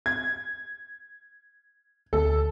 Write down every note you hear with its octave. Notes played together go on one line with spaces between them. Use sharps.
G#6
D2 A4